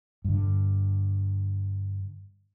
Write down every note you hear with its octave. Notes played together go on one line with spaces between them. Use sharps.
G2 D3